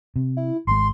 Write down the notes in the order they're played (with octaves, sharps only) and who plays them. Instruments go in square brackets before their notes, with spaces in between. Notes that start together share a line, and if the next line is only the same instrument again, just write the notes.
[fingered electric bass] C3
[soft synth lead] E4
[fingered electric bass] G#1 G#3 [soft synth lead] C6